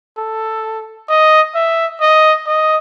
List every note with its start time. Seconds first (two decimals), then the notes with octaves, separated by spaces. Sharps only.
0.18 A4
1.09 D#5
1.55 E5
2.01 D#5
2.47 D#5